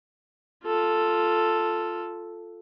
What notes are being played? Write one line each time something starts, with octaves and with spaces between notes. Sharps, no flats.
F4 A4